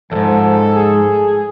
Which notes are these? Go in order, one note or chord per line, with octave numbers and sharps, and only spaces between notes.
E2 G#2 F3 A4
G#4